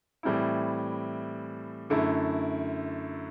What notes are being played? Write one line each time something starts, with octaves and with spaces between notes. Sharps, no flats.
A2 E3 G3 C4 E4
F#2 D3 A3 E4